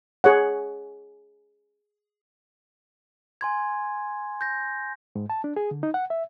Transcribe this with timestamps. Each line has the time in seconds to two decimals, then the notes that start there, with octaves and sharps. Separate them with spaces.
0.24 G#4 C#5 F#5
3.41 G#5 C6 G#6
4.41 G6 A#6
5.15 G#2
5.30 A5
5.44 D4
5.56 G#4
5.71 D3
5.83 D#4
5.94 F#5
6.10 E5